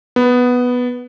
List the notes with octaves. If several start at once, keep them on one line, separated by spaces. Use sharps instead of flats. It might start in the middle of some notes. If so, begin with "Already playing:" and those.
B3